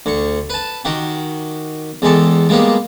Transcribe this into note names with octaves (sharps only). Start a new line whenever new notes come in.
D2 C#6
B4 A5
D#3 F#4 G4
E2 G#3 G4 A4
G3 G#3 A#3 B3 G4